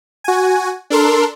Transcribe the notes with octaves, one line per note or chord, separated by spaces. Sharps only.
F#4 G#5
D4 A4 A#4 C6